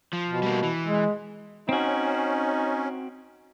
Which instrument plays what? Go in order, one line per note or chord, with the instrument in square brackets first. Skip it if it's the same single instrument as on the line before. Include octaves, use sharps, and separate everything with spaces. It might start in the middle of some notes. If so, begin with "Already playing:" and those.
[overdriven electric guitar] F3
[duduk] B2
[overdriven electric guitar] G3 A#3
E3
[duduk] G#3
[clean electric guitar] C4 F#4 [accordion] C#4 [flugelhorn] D#4